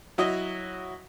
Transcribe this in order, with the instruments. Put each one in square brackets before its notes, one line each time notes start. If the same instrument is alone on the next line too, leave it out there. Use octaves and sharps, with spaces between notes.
[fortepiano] F#3 E4 F#4 D#5